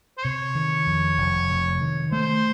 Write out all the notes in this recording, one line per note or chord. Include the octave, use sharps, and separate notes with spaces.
C5
C3 C#5
D#3
F2
F1
C3
D#3
A3 C5